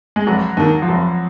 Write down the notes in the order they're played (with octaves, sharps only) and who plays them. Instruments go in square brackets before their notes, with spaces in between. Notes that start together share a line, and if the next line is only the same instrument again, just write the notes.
[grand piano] G#3
[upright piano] F1 [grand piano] F#3
[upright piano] D#2 D#3
[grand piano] F3
[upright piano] F1 [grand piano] F#3